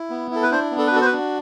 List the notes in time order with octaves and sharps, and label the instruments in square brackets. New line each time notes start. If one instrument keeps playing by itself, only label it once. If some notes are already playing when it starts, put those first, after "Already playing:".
Already playing: [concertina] E4
B3
E4 A4
B4
D4 C5
B3
A4
B4
F#4 A4
C5
B4
D4